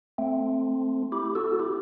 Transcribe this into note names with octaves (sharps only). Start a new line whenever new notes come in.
A3 C4
E4 G4
F#4 A4
F#4
E4 G4